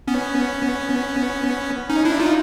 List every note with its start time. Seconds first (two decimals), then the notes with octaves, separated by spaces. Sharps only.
0.07 B3 C#4
1.90 C#4 D#4
2.05 D4 E4
2.20 D#4 F4